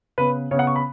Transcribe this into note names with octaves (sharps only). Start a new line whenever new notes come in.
C#3 B3 B4
C#3 B3 C#5
F#5
C#6
B5